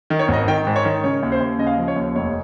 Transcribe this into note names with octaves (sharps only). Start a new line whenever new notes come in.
D#3
C#5
G#1
D#5
D#3 G5
G#2
C#5
D#3
C#3 C#5
D#2
C5
D#2
C#3 D#5
F5
D#5
F3
C#5
D#2
F1 C#5